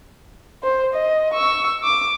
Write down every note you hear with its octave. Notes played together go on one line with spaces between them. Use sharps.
C5
D#5
C#6 E6
D6